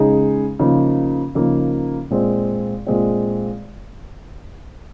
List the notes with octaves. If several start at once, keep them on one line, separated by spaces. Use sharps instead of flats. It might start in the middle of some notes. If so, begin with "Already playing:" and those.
Already playing: C#3 G#3 D#4 G#4
C#3 F3 A#3 D#4
C#3 F3 A#3 D#4
A#2 G#3 C4
A#2 G#3 C4